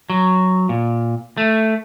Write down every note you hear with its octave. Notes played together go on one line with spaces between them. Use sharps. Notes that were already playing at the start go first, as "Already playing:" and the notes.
F#3
A#2
A3